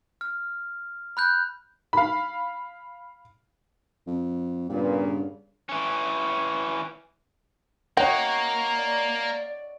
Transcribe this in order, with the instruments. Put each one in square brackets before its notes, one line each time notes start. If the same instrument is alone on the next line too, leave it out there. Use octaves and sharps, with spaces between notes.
[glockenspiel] F6
B5 F#6 G6
[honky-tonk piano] F5 B5
[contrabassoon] F2
[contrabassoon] G2 [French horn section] A#2 C#3 B3
[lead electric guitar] E3 C#4
[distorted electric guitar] A#3 [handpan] C#5 D#5 F#5 [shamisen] G5
[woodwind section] D5